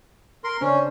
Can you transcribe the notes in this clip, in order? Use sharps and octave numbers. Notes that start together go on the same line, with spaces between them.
A#4 C6
C#3 C#4 D4 C5